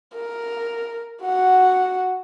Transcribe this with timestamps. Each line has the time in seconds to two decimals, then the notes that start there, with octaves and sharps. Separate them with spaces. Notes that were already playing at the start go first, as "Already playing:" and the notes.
0.14 A#4
1.24 F#4 F#5